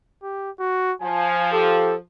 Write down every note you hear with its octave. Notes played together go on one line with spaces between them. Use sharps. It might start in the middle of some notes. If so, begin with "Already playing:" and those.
G4
F#4
F3 G#5
G4 A4